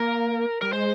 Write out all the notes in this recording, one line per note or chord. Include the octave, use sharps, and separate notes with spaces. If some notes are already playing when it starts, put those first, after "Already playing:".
Already playing: A#3 A#4
G3 A#4
G#3 C5